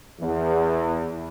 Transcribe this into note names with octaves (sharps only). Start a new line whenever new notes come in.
E2